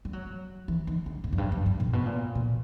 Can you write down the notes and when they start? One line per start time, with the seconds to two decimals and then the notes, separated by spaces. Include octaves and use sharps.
0.05 G3
0.13 F#3
0.68 E3
0.87 D#3
1.06 D3
1.24 G#2
1.33 F#2
1.38 G2
1.52 F#2
1.66 G2
1.80 A#2
1.93 B2
2.06 A#2
2.35 A#2